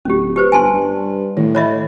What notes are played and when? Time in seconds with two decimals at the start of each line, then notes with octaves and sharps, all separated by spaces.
0.05 D1 C#4 G4
0.36 G4 B4 C5
0.52 G1 G#5 A5 C6
0.73 G2
1.37 A2 D#3
1.55 D#3 C#5 D#5 E5 B5